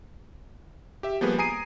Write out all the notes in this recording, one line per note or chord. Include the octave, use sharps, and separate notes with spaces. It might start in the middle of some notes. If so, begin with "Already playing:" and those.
G4 E5
F3 G3 A#3 B3 G#4 B4
G#5 A#5 D#6 C7 D7 D#7